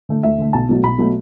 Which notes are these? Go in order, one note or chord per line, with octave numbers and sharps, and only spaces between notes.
D3 A3
D2 E5
D3 A3
B1 A5
B2 F#3 A3
B1 B5
B2 F#3 A3